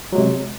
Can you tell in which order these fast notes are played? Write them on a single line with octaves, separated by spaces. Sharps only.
F#3 G#3 C3